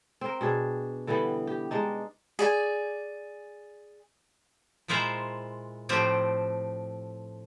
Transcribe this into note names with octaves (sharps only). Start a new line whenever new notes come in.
C4 A#4
B2 D4 G#4
D3 E3 G3 B3
G4
G#3 D4 D#4
G#4 D5 G#5
A#2 G#3 E4 F4 C5 A#5
A2 F3 A3 C4 G4 C5